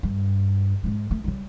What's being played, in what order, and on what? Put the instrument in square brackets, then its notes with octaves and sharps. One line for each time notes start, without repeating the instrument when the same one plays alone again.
[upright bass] G2
G#2 G#3
D3 A3
C#3 G3